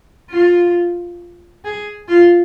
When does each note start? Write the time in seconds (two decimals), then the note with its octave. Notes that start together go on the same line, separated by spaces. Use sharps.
0.30 F4
1.64 G#4
2.08 F4